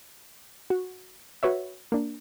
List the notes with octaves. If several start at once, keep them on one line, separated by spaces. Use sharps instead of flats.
F#4
F#4 B4 C#5 E5
A#3 D4